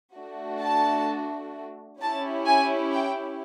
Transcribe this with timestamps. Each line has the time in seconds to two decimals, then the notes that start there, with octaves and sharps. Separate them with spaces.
0.15 A3 D4 F#4
0.62 A5
2.00 C#4 E4 G4 A5
2.46 G#5
2.93 G5